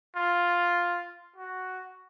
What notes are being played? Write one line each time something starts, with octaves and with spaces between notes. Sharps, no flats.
F4
F#4